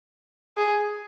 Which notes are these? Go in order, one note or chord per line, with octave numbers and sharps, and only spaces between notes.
G#4